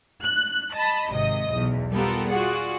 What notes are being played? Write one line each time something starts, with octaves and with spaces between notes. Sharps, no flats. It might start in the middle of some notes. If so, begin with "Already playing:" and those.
F#6
D#5 A5 B5
G#1 C3 D#5 D#6
B1 E2
G3 B3 F4 G4 A4 A#4
F4 F#4 G#4 D5 F#5